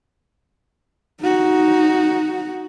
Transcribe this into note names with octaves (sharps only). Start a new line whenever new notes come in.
D#4 F#4